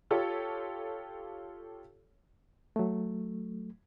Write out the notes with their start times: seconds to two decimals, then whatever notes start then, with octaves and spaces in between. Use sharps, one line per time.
0.11 F4 G4 A4 C#5
2.76 F#3 A3